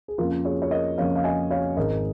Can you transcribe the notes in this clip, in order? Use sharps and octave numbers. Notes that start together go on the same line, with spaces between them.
G#4
F2 C#3 A#3 C#4 F4 A#4
G#4 C#5
C#5
A#4 D#5
F2 C#3 A#3 C#4 C#5 F5
F5
D#5 G#5
C#5 F5
G#1 G#2 G#3 A#4 D#5